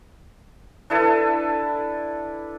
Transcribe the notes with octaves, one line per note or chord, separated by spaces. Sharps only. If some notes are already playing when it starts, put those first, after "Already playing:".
D4 E4 A4 B4